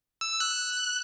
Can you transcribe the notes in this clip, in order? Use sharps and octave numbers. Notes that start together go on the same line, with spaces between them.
E6
F#6